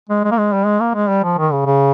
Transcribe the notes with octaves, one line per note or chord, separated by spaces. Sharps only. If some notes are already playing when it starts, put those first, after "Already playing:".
G#3
G#3
A#3
G#3
G3
G#3
A#3
G#3
G3
F3
D#3
C#3
C#3